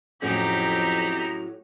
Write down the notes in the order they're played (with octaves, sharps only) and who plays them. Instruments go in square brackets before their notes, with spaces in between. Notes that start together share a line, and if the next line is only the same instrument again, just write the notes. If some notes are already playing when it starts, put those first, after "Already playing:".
[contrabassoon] F2 [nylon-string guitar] A2 F#3 C#4 [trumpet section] D#4 E4 A#5 [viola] G4